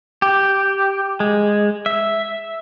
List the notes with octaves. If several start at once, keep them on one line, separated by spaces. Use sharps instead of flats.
G4
G#3
E5